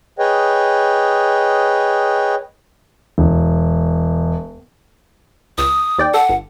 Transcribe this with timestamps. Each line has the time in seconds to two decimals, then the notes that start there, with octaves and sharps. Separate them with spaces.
0.19 G#4 B4 C#5 D#5 G5
3.18 E1
5.58 C#2 D#6
5.98 D#2 D5 G5
6.14 A4 F#5
6.29 G1